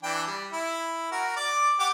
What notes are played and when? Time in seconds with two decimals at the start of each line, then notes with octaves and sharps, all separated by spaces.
0.03 E3 D4 G5
0.27 G3
0.53 E4
1.12 F#4 A#4
1.36 D5 D6
1.80 G4 F#5 D6